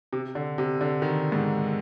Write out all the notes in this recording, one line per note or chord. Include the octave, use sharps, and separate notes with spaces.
C3
D3
C3
D3
D#3
G#2